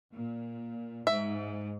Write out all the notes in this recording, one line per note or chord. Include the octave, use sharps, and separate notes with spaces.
A#2
G#2 E5